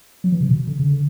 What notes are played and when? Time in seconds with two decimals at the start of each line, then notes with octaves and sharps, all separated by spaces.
0.24 F#3
0.32 E3
0.41 C#3
0.49 B2
0.67 D3
0.80 C#3
0.89 D3